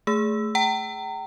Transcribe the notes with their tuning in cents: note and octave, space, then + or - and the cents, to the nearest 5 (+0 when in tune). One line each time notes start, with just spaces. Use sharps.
A3 +0 G#4 +0 E6 +0
G5 -35 A#5 -30